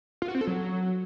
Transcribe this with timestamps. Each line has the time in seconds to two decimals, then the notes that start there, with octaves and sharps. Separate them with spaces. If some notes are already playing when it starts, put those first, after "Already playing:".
0.22 F4
0.28 F#4
0.35 C4
0.41 A4
0.47 F#3